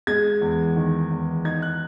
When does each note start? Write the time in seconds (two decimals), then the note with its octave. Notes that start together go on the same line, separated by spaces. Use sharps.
0.07 G#3 G#6
0.41 E2
0.76 D#3
1.11 E2
1.45 D#4 G#6
1.62 F#6